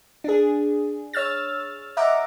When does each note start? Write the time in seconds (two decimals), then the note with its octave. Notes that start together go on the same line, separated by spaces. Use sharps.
0.24 D4 G#4
1.13 C#5 E6 F6 A6
1.97 D#5 E5 F#5 A#5 D6